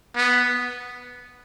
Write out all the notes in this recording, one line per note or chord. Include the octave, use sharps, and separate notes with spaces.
B3